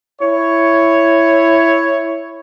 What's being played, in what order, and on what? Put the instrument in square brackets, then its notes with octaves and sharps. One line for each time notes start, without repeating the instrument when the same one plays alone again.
[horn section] E4 C#5